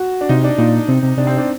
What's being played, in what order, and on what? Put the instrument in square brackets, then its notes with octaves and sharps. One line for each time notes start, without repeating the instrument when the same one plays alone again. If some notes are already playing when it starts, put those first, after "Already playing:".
Already playing: [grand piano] F#4
D4
[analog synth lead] C3 [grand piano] D#4
[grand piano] D4
[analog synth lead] A#2 [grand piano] D#4
[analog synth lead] C3
C3
[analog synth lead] C3 [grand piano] D4
[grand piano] C4
D4